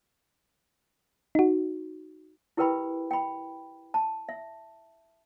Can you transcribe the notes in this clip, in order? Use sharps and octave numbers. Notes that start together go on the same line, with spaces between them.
D#4 F#4
E4 G4 A#4 B4 G5 B5
G5 B5
A5
E5